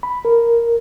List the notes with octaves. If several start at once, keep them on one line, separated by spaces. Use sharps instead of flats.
B5
A#4